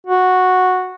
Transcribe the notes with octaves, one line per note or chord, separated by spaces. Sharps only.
F#4